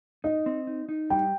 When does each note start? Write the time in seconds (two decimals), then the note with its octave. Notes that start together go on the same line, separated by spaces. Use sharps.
0.24 D#4 D#5
0.46 C4
0.67 D#4
0.89 D#4
1.10 G3 G5